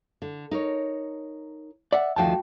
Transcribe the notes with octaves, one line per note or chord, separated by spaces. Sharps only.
D3
D#4 A#4 C#5
D5 E5 F#5
D2 D#3 F3 F#4 G5 A5